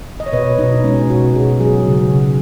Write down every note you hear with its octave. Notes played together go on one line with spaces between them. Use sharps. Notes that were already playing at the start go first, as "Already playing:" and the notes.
D#5
C#5
B2 B4
B2 D#4
G#3 C#4
B2 F#4
B2 G#4
F#3 G#4
F#4
C#3 G#4
C#3